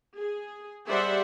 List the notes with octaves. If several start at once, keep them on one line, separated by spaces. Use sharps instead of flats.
G#4
G3 G#4 C5 D5 E5 F#5